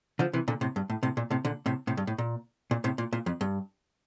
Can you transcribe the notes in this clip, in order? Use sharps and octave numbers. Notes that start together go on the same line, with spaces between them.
D3 F3
C3 E3
A#2 D3
A2 C3
G2
A2
A2 C3
A#2
A2 C3
A#2 D3
A2 C3
A2 C3
G2
A2
A#2
A#2
A2 C3
A#2
A#2
F2
G2